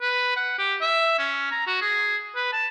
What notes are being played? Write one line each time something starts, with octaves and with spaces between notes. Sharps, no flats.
B4
F#5
G4
E5
C#4
A#5
F#4
G#4
B4
A5